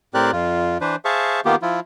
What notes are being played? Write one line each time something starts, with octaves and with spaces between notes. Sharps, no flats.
A2 C4 G4 A#4 D5 F#6
F2 F4
E3 D4 B4 C5
G#4 C5 E5 F5 A5 C#6
D#3 A#3 B3 F4 G4
F3 E4 F4